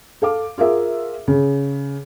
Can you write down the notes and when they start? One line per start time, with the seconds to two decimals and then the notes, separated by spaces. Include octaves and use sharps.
0.22 A4 F5 D6
0.58 F4 G#4 A#4 E5
1.28 C#3